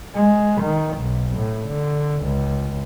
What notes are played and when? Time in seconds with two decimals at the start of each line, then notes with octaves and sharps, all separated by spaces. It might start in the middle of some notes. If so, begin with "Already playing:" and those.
0.15 G#3
0.61 D#3
0.98 B1
1.36 A2
1.66 D3
2.23 C#2